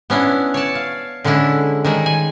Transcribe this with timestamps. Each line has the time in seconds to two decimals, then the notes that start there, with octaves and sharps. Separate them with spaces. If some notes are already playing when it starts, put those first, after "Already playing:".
0.10 B3 C#4 D4 E4
0.54 C#5 D5 A5
0.75 F5
1.24 D3 G#3 C#4 D4 E4
1.84 D#3 G3 G#3
2.06 G#5